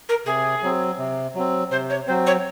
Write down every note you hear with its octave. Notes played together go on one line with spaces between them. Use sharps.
A#4
C3 G#4
F#3 C4
C3
F#3 C4
C3 C5
C#5
F#3 C4 C5
C#5